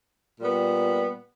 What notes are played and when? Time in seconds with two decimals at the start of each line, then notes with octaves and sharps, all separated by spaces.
0.39 A#2 G3 B3